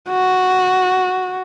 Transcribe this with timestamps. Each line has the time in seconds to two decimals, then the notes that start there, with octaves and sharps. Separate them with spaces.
0.10 F#4